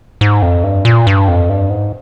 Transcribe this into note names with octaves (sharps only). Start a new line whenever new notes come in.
G#2
F2
G2
A#2
G2
F2
G2
G#2